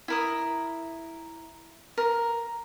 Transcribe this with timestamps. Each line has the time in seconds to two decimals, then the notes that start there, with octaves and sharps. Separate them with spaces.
0.08 E4 A#4 D#6
1.98 A#4